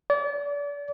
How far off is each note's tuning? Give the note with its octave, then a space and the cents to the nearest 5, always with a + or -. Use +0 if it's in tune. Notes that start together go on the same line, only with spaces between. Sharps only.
D5 -35